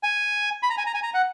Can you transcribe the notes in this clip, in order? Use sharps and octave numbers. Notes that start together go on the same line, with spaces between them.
G#5
B5
A#5
G#5
A#5
G#5
A#5
F#5